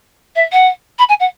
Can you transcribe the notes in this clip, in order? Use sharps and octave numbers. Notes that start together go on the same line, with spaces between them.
E5
F#5
B5
G#5
F#5